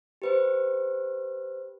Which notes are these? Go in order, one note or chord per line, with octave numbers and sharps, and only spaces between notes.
G4 B4 C5